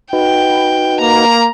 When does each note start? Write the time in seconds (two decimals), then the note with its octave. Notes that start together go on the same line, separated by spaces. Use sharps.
0.13 D#4 F#4 B4 G5
1.01 A#3 A#5